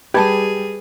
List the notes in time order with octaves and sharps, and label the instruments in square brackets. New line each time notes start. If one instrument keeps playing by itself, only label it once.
[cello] G3 G#4 [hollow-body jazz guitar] G4 A5 [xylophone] B4 B5 G#6